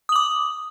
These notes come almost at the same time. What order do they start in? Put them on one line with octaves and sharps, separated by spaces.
D#6 F#7 D6